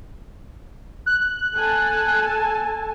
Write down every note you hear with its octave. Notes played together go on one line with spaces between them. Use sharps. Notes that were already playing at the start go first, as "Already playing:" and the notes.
F#6
A4 G#5 A5